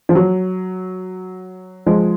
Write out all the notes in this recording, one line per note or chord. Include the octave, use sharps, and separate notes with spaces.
F3
F#3
F3 G#3